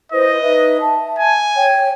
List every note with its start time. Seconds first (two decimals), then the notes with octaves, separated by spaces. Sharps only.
0.12 E4 B4 C5 D#5
0.41 D#4 B4 E5
0.80 E5 A5
1.19 G#5
1.56 C#5 G5